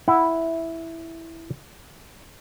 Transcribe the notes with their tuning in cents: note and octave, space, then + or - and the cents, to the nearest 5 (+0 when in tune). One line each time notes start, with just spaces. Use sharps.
E4 +0 F#5 +0